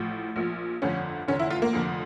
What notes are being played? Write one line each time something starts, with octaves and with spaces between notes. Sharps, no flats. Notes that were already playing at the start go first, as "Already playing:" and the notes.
Already playing: A1 A2 F3
A#1 A#2 F3
G1 F2 D3 F3 C#4
F1 E2 D3 C#4
E4
F4
A#3
F1 F2 D3 F3